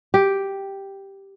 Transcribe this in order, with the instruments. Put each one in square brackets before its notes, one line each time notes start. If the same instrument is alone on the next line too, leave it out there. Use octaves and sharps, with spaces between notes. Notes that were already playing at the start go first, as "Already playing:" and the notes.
[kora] G4